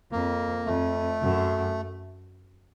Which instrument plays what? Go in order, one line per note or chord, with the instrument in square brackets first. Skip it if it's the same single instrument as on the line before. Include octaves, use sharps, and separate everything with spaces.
[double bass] F2 [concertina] A#3
[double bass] F2 [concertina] A3
[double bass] F#2